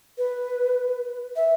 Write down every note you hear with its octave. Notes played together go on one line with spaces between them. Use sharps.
B4
E5